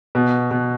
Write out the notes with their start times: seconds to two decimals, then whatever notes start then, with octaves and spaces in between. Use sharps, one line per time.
0.15 B2
0.51 B2